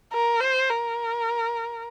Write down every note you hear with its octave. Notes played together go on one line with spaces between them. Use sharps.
A#4
C5
A#4